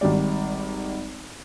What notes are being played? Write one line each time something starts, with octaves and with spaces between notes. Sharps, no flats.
G#1 D#3 G3 D5